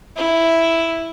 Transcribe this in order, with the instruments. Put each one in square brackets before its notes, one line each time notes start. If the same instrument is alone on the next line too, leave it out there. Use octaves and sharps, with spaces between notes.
[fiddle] E4